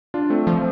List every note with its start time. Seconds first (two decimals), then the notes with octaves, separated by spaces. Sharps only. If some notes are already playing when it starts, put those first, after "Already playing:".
0.14 D4 F4
0.30 A3 C4
0.47 F3